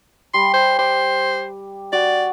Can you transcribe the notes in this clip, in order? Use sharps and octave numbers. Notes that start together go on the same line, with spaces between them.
G3 C6
C5
C5 D6
F#4 D5